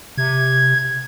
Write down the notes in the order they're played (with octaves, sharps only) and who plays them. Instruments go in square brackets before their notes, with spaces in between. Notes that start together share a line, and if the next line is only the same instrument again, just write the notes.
[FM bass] C3 [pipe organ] G#6